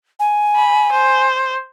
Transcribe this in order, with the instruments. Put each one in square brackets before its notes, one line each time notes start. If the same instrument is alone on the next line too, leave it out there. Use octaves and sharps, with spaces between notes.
[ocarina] G#5
[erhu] B5
C5